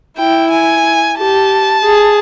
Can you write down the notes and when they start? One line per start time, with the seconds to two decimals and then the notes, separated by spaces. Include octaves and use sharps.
0.18 E4 G5
0.51 G#5
1.18 G4 A5
1.85 G#4